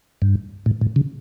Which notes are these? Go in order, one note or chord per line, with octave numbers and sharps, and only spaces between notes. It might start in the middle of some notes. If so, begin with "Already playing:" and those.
G2
A2
A2
C#3